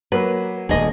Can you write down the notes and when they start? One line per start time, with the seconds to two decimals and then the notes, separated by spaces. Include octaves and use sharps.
0.12 F#3 A#3 B4
0.69 D#1 D2 G#4 D#5